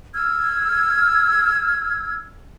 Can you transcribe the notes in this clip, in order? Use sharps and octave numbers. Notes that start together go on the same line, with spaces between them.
E6 F6 G#6